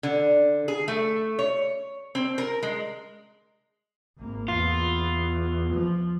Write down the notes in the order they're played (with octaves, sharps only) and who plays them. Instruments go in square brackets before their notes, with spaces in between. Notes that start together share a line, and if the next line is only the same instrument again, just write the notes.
[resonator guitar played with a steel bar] D3
G#4
A3
C#5
C4
A#4
G#3
[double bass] G#1 A#3
[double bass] E2 [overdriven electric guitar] F4
[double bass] F3